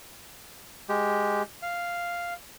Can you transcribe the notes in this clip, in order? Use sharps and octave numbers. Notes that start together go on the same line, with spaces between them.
G#3 G4
F5